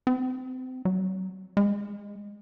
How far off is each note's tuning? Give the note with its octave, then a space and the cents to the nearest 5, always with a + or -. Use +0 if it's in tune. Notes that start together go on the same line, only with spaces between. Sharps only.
C4 -30
F#3 +35
G#3 -20